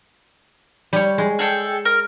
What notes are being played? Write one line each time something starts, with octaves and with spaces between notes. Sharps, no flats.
G3 C#5
G#3
G#4 A4 G5
A#4 F6